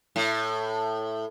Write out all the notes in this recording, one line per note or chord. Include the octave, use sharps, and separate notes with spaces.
A2